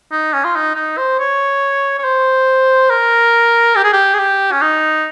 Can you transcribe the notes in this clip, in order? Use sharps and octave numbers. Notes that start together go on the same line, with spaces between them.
D#4
C#4
F4
D#4
D#4
C5
C#5
C#5
C5
A#4
G4
G#4
G4
G#4
G4
C#4
D#4